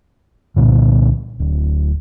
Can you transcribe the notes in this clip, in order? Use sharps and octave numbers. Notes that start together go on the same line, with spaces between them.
C2 A#2 D3
D1